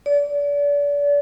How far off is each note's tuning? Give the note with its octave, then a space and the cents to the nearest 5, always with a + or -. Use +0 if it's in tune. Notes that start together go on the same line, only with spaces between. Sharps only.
D5 -35